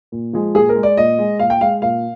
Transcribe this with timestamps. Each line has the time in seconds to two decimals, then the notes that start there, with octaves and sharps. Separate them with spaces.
0.12 A#2
0.33 F3 G#3
0.55 A#2 G#4
0.69 A#4
0.76 G#3
0.83 D5
0.97 A#2 D#5
1.19 G#3
1.39 A#2 F5
1.50 G5
1.61 G#3 F5
1.82 A#2 F5